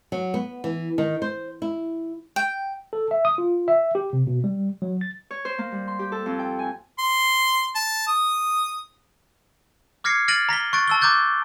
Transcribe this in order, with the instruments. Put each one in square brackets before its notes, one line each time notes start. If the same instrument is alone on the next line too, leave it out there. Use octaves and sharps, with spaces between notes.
[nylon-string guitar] F#3
B3
E3
D#3
C5
E4
[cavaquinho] G5
[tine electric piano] A4
E5
D#6
F4
E5
G4
C3
B2
G3
F#3
A6
[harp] C#5
C5
A#3
G3
C6
G4
A4
F2
G5
G#5
[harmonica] C6
A5
D#6
[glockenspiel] D6 F6 G#6 A#6 C7 C#7
F6 A6 A#6 D7 D#7 F#7
A#5 A#6 B6 G7
C#6 F#6 A6 D7
A5 E6 G7
A#5 D6 F#6 G6 A6